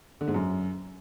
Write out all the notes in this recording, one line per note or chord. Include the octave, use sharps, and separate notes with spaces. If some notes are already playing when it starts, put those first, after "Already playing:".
D3
G#2
F#2